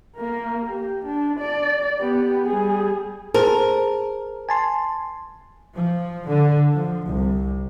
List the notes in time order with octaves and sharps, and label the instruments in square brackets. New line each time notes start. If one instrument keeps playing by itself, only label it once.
[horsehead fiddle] A#3 A#4
G4
D4
D5
B3 G4
G3 G#4
[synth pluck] G#4 C5 A5 [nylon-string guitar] A#4
[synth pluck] G#5 A5 C6
[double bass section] F3
D3
F3
C2